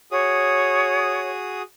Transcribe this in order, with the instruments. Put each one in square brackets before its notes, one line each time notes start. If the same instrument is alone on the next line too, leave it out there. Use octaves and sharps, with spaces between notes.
[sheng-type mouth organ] F#4 G#4 D#6 [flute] C#5